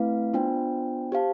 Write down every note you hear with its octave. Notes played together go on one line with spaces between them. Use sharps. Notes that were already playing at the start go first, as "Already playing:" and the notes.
Already playing: A3 C4 E4 B4 F5
B3 D4 F4 C5 G5
G4 C5 F5 A5